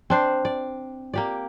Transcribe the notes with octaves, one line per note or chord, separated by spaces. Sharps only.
C4 D4 C5
D5
A#3 G4 D5